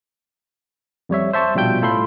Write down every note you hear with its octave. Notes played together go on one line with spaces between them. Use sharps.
F2 G3 C#5 E5
C5 E5 A5 C#6
A#1 B2 G3 F4 G5 G6
A2 F4 A4 B5 C6